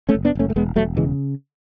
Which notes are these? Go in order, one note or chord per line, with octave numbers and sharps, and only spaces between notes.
A3 C#4
F#1
B3 D4
F#1 A3 C#4
A3
E1 G#3 B3
E1 F#3 A3
C#3 E3 G#3